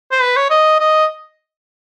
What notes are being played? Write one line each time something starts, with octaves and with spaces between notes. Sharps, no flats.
C5
B4
C#5
D#5
D#5